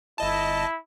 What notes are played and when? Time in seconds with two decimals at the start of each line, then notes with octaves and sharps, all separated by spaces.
0.18 G1 E4 D#5 A5